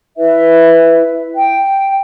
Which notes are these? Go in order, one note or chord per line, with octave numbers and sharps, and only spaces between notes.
E4 B4 E5
G5